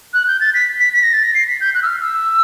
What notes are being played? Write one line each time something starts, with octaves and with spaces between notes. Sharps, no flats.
F#6
G6
A6
B6
B6
B6
A#6
A6
A#6
C7
B6
G6
F#6
E6
F6
E6